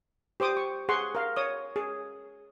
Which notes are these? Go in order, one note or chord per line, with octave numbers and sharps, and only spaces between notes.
G4 C5 D6 D#6
C#6
G#4 F#5 C6 C#6
A#4 F5
C#5 D#6
G#4